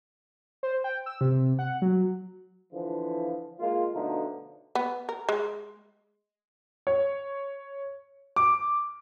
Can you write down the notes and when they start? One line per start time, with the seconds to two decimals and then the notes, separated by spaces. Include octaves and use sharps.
0.63 C5
0.84 G5
1.06 E6
1.21 C3
1.59 F#5
1.82 F#3
2.73 D3 E3 F3
3.59 G#3 A#3 F4
3.93 B2 D3 F3 A3 D#4
4.75 B3
5.09 A#4
5.29 G#3
6.87 C#5
8.36 D6